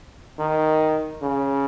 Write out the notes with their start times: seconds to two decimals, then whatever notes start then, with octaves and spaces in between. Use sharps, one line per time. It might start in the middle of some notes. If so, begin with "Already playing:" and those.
0.39 D#3
1.22 C#3